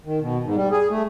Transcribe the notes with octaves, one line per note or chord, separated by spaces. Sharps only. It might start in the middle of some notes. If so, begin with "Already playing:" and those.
D#3
B2
G#2
G3
G#4
A3